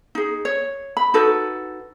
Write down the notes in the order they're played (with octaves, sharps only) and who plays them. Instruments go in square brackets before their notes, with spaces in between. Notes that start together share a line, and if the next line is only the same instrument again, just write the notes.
[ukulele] D#4 G#4
C#5
B5
D#4 F#4 A4 B4